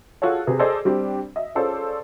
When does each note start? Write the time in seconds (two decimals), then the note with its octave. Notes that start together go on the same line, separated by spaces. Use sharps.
0.22 F4 F#4 G#4 A4 C#5
0.47 C3 G#4 B4
0.59 G#4 A4 C5 D5 D#5
0.85 G3 C4 D4 G4
1.36 D#5 E5
1.55 C#4 F4 G#4 A4 C5 D5